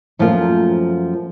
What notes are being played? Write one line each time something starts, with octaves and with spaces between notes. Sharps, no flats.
F#2 F3 A3 A#3 F4